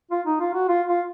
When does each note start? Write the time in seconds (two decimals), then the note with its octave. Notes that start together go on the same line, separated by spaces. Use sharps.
0.11 F4
0.26 D#4
0.40 F4
0.54 F#4
0.69 F4
0.88 F4